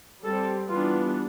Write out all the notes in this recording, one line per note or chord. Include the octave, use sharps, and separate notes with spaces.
G3 C4 A4
E3 G3 B3 D4 F4